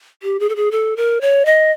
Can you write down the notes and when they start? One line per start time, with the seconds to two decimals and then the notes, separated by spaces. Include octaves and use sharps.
0.23 G4
0.40 G#4
0.49 A4
0.56 G#4
0.71 A4
0.97 A#4
1.21 C#5
1.45 D#5